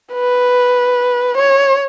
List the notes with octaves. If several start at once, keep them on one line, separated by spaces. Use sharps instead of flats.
B4
C#5